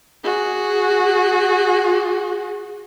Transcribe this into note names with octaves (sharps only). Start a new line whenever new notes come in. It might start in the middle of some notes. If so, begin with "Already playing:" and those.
F#4 G#4